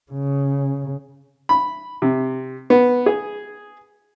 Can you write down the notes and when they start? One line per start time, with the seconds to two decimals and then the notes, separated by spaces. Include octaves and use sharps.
0.12 C#3
1.49 B5
2.02 C3
2.70 B3
3.06 G#4